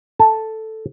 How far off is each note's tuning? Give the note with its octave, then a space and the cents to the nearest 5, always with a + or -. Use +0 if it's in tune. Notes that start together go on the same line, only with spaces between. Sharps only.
A4 +0 A5 +0